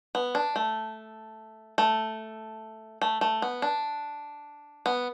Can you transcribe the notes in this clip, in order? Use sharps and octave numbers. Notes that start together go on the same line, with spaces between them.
B3
D4
A3
A3
A3
A3
B3
D4
B3